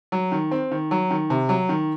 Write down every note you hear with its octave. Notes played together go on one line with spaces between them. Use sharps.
F#3
D#3
C4
D#3
F#3
D#3
C3
F#3
D#3